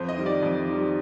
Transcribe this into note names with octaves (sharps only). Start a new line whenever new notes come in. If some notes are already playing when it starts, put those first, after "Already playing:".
Already playing: F2 C5
D#5
D#3 G3
D5
F2
D#3 G3